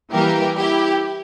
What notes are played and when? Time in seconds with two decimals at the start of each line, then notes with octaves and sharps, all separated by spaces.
0.12 E3 G3 A#3 G4 A#4
0.57 E4 G4